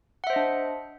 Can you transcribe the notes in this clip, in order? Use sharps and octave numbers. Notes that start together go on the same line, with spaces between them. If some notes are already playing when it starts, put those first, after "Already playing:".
D4 C5 D#5 E5 F#5